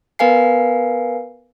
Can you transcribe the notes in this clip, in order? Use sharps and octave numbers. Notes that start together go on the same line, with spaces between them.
B3 A#4 B4 F5 G#5 C7